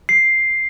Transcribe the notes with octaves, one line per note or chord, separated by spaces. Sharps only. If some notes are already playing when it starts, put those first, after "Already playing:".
C7